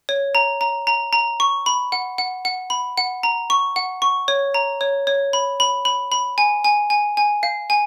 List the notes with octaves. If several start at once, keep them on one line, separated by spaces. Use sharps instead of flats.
C#5
A#5
A#5
A#5
A#5
C#6
B5
F#5
F#5
F#5
B5
F#5
A#5
C#6
F#5
C#6
C#5
A#5
C#5
C#5
B5
B5
B5
B5
G#5
G#5
G#5
G#5
F5
G#5